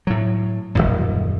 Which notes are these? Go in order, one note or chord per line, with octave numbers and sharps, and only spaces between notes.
A2 F#3
D#1 G#1 F#2